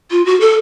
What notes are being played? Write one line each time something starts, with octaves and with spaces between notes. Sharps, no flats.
F4
F#4
A4